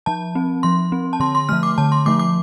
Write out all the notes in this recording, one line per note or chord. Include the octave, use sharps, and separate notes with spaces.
F3 A5
C4
F3 C6
C4
A5
D3 C6
C6
F3 A3 F6
D6
D3 A5
C6
F3 A3 D6
D6